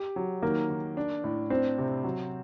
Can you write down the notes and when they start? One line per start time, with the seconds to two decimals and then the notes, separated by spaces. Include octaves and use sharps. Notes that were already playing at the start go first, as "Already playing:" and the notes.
Already playing: G4
0.16 F#3
0.42 D#3 A#3
0.70 D#3
0.97 D4
1.24 A2
1.50 C4 D4
1.78 C3
2.04 F#3